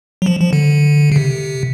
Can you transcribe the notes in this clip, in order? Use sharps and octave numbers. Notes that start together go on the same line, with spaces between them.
F#3
F3
F3
D3
C#3
C3